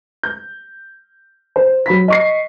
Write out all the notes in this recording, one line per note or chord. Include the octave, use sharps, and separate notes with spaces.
G6
C5
F#3 B5 B6
D#5 C#6 C7